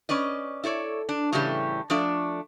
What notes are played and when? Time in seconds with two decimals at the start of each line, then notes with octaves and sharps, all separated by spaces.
0.09 C#4 B4 D5 D#5
0.64 E4 A4 C#5 D5
1.09 D4
1.33 A2 C#3 E3 G3 A3 G4
1.90 F3 A3 D4 D5